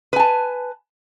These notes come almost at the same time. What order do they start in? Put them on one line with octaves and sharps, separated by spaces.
B4 G#5 A5